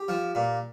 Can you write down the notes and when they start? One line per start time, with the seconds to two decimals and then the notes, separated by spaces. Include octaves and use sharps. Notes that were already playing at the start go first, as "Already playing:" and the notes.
Already playing: G4
0.08 F3
0.35 A#2